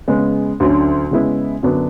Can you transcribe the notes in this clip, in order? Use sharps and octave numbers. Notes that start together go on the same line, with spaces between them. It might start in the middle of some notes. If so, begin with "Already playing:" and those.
C#3 G#3 B3
D2 D3 F#3 C#4
C#3 G#3 B3 E4
F#2 D3 F#3 B3 D4